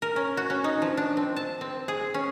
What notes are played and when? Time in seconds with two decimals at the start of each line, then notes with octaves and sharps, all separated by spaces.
0.02 A#4
0.16 C#4
0.37 F#4
0.50 C#4
0.64 D#4
0.82 F3
0.97 D4
1.17 C4
1.36 A5
1.61 C4
1.88 G#4
2.14 C#4